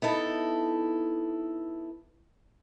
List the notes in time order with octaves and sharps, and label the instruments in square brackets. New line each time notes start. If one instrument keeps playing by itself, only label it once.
[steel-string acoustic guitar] B3 D#4 E4 A4